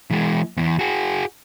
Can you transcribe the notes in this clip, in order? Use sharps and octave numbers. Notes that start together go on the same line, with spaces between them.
E3 G#3
E2 E3
F#4 G#4